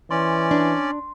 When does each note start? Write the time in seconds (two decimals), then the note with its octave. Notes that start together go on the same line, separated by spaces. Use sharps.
0.11 E3 C#4 D5 C6
0.51 D4